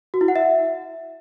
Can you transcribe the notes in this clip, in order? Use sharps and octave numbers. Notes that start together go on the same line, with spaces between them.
F#4
E4
F#5
E5